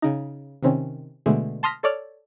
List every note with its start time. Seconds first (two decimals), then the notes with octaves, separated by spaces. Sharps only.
0.02 C#3 D#4
0.63 C3 D#3 C4 C#4
1.26 B2 D3 G#3 A3
1.63 A5 C6 D#6 F6 A#6 B6
1.83 A4 C#5 D5 F6